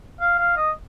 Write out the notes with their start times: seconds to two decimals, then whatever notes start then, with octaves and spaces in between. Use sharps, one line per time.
0.21 F5
0.39 F5
0.57 D#5